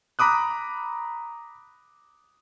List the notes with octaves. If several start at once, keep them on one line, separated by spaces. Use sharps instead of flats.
A#5 B5 D6 D#6 F#6